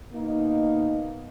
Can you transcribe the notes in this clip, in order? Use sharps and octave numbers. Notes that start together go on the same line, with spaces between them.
B2 A#3 D#4